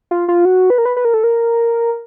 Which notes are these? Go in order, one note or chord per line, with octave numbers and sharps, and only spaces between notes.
F4
F4
F#4
B4
A#4
B4
B4
A#4
A4
A#4